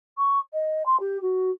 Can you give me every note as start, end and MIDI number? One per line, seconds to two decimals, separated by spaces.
0.18 0.39 85
0.53 0.83 75
0.86 0.99 84
1.00 1.21 67
1.22 1.51 66